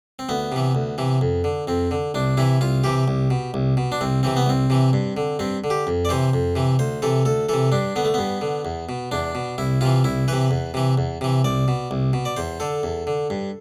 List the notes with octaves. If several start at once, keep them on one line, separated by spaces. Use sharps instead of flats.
C4
D2 B3
C3 E3
D2
C3 E3
F2
D3
F2 C4
D3
C2 D4
C3 E3 E4
C2 F4
C3 E3 G4
C2
B2
C2
B2
D4
C2 C4
C3 E3 C4
B3
C2 C4
C3 E3
G2
D3
G2 C4
D3
G4
F2
D5
C3 E3 C5
F2
C3 E3
D2 C5
C3 E3 A4
D2 A4
C3 E3 A4
G2 D4
D3 B3
A3
G2 B3
D3
E2
B2
E2 D4
B2
C2 E4
C3 E3 F4
C2 E4
C3 E3 B4
E2
C3 E3
E2
C3 E3
C2 D5
B2
C2
B2
D5
E2 C5
D3 A4
E2
D3
G2